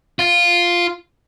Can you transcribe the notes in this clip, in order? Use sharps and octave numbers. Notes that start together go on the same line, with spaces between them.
F4